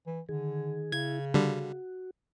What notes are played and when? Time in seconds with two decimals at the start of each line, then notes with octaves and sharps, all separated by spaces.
0.06 E3
0.29 D3 D#3 G#4
0.92 C#3 E4 G#6
1.34 D3 G3 F#4